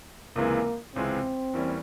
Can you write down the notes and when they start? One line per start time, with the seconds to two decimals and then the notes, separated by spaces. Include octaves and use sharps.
0.36 C#2 C3 E3 G#3 A#3
0.95 C#2 C3 E3 G#3 C4
1.54 E2 E3 G3 A#3 C#4